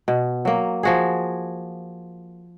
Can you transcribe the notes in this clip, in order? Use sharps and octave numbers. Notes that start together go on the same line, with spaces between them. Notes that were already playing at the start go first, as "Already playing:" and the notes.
B2
F#3 A#3
F3 F#4 G#4